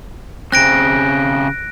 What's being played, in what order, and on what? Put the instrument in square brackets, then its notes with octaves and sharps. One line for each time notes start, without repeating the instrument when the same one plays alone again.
[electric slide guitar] C#3 C4 [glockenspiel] F#6 A#6 D7